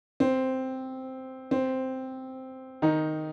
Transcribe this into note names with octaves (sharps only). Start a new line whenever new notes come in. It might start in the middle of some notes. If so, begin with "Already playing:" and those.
C4
C4
D#3 D#4